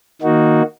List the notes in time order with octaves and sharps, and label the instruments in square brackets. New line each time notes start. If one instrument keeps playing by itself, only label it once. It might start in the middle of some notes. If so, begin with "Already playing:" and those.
[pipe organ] D#3 A#3 D#4 F#4